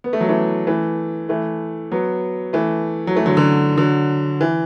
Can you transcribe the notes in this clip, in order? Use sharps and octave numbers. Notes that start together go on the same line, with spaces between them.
B3
A3
F#3
E3 A3
E3 A3
E3 A3
F#3 B3
E3 A3
F#3
E3 A3
D3 F#3
D3 F#3
D3 F#3
E3